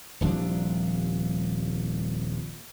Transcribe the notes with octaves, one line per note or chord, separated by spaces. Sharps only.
D#1 C2 F3 D4